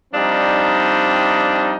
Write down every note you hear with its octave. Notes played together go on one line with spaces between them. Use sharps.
F3 G3 C4 D4 D#4